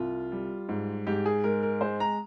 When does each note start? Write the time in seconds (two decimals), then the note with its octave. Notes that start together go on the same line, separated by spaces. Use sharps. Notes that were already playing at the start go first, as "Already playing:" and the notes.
Already playing: C2 F4
0.32 G3
0.69 G#2
1.07 G#2 G4
1.26 G#4
1.44 G#3 A#4
1.63 A#4
1.81 G#3 C5
2.00 A#5